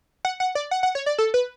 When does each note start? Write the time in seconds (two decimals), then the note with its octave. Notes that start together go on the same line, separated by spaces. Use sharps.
0.25 F#5
0.40 F#5
0.55 D5
0.71 F#5
0.83 F#5
0.95 C#5
1.06 D5
1.18 A4
1.34 B4